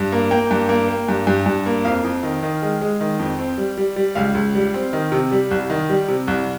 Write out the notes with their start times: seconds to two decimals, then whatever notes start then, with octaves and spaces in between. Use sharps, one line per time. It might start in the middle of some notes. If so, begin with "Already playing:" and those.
Already playing: G2
0.12 A#3
0.31 A#3 G5
0.51 G2
0.69 A#3
0.88 A#3
1.09 G2
1.27 G2
1.46 G2
1.66 A#3
1.85 F2 F5
2.04 F2
2.23 D#3
2.43 D#3
2.62 G#3
2.81 G#3
3.01 D#3
3.19 F2
3.39 C4
3.58 G3
3.77 G3
3.96 G3
4.15 C#2 F5
4.35 C#2
4.55 G3
4.74 C4
4.93 D#3
5.12 C3
5.31 G3
5.51 C2
5.70 D#3
5.89 G3
6.08 C3
6.27 C2